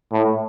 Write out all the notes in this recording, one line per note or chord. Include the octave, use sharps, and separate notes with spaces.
A2